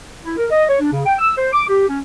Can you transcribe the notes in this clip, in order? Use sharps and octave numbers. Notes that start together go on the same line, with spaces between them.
E4
A#4
D#5
C#5
D4
C#3
G5
E6
C5
D6
G4
C#4